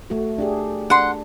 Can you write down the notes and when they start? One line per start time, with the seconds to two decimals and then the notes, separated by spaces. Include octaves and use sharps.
0.10 A3 F#4
0.38 D4 G4 G#4
0.90 D4 F#5 C6